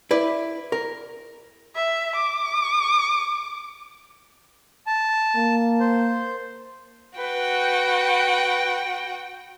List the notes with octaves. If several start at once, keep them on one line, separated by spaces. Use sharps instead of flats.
E4 B4 D5
A#4
E5
D6
A5
A#3
C5
F#4 B4 G5